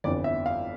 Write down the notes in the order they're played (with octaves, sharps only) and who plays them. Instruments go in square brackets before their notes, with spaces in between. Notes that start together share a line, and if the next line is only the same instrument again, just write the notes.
[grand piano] G1 F2 E3 B3 D4 D5
E5
F5